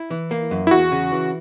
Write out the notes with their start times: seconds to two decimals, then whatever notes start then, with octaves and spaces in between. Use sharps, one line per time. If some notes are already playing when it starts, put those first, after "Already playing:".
Already playing: E4
0.11 E3
0.31 A#3
0.51 F#2
0.67 E4
0.71 E2 F#4
0.92 C#3
1.12 E3